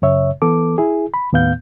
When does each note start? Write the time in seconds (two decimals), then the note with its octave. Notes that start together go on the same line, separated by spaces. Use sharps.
0.02 F#2 C#3 C#5 E5
0.42 E3 B3 A4 D6
0.78 E4 G#4
1.14 B5
1.33 D#2 A2 B3 F5 G6